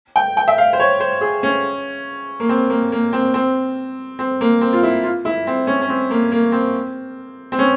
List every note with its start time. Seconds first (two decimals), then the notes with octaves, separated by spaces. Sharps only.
0.16 G5
0.37 G5
0.48 E5
0.58 F5
0.73 C5
0.80 C#5
1.00 C5
1.21 G#4
1.43 C#4
2.40 A#3
2.49 C4
2.70 A#3
2.92 A#3
3.13 C4
3.34 C4
4.19 C4
4.41 A#3
4.61 C4
4.73 F4
4.83 E4
5.04 F4
5.25 E4
5.47 C4
5.67 C#4
5.81 C#4
5.89 C4
6.11 A#3
6.32 A#3
6.52 C4
7.52 C4
7.59 C#4